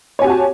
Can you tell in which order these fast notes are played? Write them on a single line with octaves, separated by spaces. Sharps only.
C#5 G#5 G4 F#4 A5